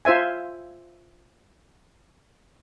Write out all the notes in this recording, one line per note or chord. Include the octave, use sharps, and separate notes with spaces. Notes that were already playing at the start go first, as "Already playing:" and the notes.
F4 C5 E5 G#5